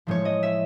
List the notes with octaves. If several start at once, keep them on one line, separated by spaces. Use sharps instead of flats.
A2 F3 G#3 C#5
D#5
E5